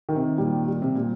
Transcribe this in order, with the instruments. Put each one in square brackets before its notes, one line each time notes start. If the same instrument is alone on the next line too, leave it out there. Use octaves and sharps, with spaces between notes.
[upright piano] D#3
[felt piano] C3
[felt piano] A#2 [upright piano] G3
[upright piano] G3
[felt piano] C3
[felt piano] A#2 [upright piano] G3